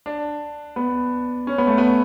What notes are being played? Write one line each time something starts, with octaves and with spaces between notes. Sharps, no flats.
D4
B3
C#4
B3
A3
B3